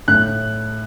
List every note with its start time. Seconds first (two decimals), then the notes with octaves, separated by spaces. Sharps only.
0.08 A2 F#6